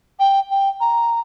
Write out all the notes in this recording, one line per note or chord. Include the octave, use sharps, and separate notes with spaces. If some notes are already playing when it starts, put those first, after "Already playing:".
G5
G5
A#5